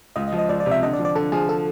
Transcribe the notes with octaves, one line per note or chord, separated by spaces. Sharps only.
C#2 D#5
D#5
F3
D#5
C#2 D5
D5
C3
E5
D3 D#5
D5
F3
D5
D3 A4
F3 G#4
A4